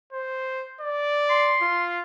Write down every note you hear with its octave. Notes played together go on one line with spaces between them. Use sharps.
C5
D5
C6
F4